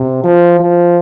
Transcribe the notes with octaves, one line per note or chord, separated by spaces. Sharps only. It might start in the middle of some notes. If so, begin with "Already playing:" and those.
Already playing: C3
F3
F3